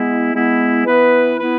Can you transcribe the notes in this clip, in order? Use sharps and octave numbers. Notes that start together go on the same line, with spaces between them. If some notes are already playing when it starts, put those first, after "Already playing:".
Already playing: G#3 B3 E4
G#3 B3 E4
E3 B3 E4 B4
B3 E4 B4